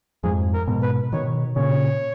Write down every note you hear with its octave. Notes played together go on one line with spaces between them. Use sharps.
F2 G#2 G#4
A#4
G#2 B2
B4
B2 D#3 C#5
A#2 C#3 C#5